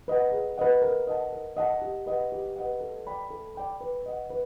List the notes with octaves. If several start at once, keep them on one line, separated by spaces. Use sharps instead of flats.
B4 D#5 F#5
G#4
B4 D#5 F#5
A#4
D#5 F#5 A5
A#4
D#5 F#5 A5
G4
B4 D#5 F#5
G4
B4 D#5 F#5
A4
D5 G5 B5
A4
D5 G5 B5
B4
D#5 F#5
B4